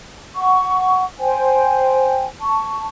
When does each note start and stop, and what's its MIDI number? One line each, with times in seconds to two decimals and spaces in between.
0.35 1.04 78
0.35 1.04 85
1.19 2.26 72
1.19 2.26 79
1.19 2.26 80
2.40 2.87 81
2.40 2.87 85